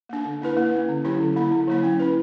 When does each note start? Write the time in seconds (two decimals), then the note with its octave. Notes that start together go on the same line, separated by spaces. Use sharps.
0.09 A#3 D4
0.25 D3
0.42 A#3 E4 B4
0.57 A#3
0.72 C#4 E4
0.88 D3
1.05 F#3 C#4 E4 G4
1.20 D3
1.36 A#3 E4
1.51 D3
1.67 F#3 A#3 E4
1.83 C#4
1.99 E4 B4